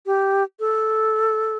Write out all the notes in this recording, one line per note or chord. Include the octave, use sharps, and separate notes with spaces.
G4
A4